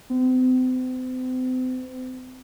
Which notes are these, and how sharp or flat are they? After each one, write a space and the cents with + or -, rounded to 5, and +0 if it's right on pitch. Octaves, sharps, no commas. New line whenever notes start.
C4 -40